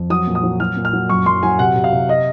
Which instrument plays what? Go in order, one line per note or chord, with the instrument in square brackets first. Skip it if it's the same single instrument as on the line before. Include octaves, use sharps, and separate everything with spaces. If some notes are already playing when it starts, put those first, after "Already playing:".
Already playing: [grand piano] F2
F#3 D#6
A#2
D#6
F#3
F#3 F6
A#2
F6
F#3
F#2 C#6
F#2 C6
F#3 G#5
C3 F#5
C3
F5
C3
D#5